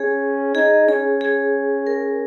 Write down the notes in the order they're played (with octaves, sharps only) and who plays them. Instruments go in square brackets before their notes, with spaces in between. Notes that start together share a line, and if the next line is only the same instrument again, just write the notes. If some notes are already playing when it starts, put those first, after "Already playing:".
Already playing: [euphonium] C#4 [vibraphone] G#4
[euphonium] D#4 [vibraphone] G#4
[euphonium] C#4 [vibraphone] G#4
[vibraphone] G#4
A#4